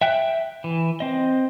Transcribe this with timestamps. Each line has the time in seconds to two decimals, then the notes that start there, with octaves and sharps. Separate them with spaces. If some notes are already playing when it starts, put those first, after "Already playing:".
0.01 E5 G5 F#6
0.64 E3
1.00 C4 D#5